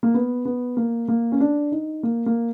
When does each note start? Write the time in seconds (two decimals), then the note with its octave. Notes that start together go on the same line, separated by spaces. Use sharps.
0.03 A#3
0.14 B3
0.45 B3
0.77 A#3
1.08 A#3
1.32 C#4
1.40 D4
1.72 D#4
2.03 A#3
2.26 A#3